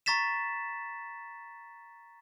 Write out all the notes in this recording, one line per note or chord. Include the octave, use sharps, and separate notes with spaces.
A#5 C#6 A6 B6 E7